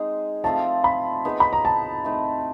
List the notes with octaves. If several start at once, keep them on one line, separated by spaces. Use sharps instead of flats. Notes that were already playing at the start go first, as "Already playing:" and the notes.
Already playing: G#3 C4 D#4 G#4
F3 A3 C4 F4 A5
B5
B3 D#4 G#4 B4
B5
A#5
A5
A3 C4 D#4